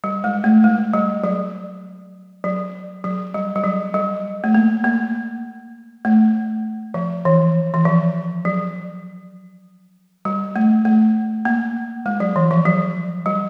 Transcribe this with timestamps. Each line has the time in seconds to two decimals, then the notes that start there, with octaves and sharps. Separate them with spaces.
0.04 G3
0.24 G#3
0.44 A3
0.64 G#3
0.93 G3
1.24 F#3
2.44 F#3
3.04 F#3
3.34 G3
3.56 G3
3.64 F#3
3.94 G3
4.44 A3
4.55 A#3
4.84 A#3
6.05 A3
6.94 F3
7.25 E3
7.74 E3
7.85 F3
8.45 F#3
10.25 G3
10.56 A3
10.85 A3
11.45 A#3
12.06 G#3
12.20 F#3
12.36 E3
12.51 F3
12.66 F#3
13.26 G3